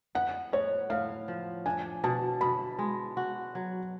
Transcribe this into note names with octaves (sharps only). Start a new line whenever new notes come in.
B3 F#5
A2 C#5
A2 F5
F3
D4 G#5
B2 A5
B2 B5
G#3
F#4
F#3